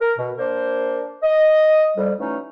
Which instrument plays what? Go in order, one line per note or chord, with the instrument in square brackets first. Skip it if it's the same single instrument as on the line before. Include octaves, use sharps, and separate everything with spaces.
[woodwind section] A#4
B2
A#3 D4 A#4 C5
D#5
F2 G3
E3 F#3 A3 C#4 D#4